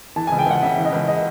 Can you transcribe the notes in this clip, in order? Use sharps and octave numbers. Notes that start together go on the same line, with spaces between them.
E3 A5
G#5
C#2
G5
C#2 F#5
C#3 E5
E3
D#5
C#2
D#5